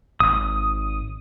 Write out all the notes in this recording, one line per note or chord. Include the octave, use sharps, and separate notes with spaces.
G#1 D#6